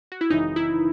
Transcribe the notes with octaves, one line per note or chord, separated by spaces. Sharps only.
F#4
E4
G#1 F#2 C#3 E3 D#4
E4